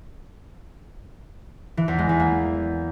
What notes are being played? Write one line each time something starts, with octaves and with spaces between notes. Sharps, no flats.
E3
E2
G#3
E2
A#3